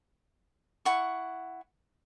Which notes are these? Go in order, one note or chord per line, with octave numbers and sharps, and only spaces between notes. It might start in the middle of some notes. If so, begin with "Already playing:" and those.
E4 F#5 C#6